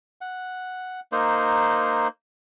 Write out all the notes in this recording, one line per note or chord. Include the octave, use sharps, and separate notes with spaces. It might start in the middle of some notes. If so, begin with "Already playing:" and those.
F#5
A#3 D#4 C5